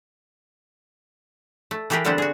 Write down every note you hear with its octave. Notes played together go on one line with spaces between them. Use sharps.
A3
E3 A3 G4 G#4 A#4 B4
D3 G3 A3 B3 C4 D4
F#4 G#4